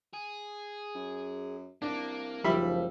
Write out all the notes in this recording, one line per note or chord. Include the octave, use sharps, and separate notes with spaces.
G#4
F#2
C2 A#3 D4
F#1 C#2 G#2 F3 G3 E5 B5